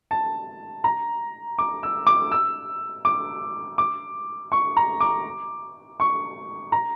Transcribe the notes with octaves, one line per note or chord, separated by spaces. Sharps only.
A5
A#5
D6
E6
D6
E6
D6
D6
C#6
A#5
D6
C#6
A#5